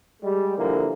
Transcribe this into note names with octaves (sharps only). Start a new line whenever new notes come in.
G3 G#3
D3 E3 F3 A#3